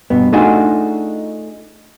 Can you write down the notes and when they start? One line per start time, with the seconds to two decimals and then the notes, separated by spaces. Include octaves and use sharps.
0.10 G2 B2 B3
0.32 A3 D4 D#4 F4 F#4 G#4